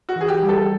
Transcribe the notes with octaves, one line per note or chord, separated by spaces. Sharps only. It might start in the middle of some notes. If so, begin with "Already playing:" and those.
F#4
E3 G#4
G4
G3
A4